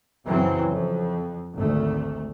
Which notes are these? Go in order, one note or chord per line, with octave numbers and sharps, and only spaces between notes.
F#2 C#3 E3 F#3 C4
F2
G#1 D2 A3